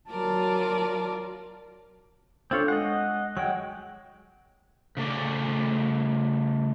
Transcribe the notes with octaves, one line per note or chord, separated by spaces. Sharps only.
F#3 F4 A#4 D5 A5
C4 D4 F4 A4 C#5
G#3 D#5 F#5
F#3 G#3 F#5 G5
C#3 A3 D5